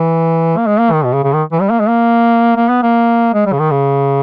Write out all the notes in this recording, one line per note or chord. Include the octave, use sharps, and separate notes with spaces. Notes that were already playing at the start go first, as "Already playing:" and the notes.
Already playing: E3
A#3
G#3
A#3
D#3
B2
C#3
C#3
D#3
E3
G3
A#3
G#3
A#3
A#3
B3
A#3
G#3
G3
C#3
D#3
C#3